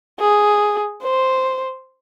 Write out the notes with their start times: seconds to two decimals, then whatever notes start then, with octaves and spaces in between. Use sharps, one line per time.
0.19 G#4
1.03 C5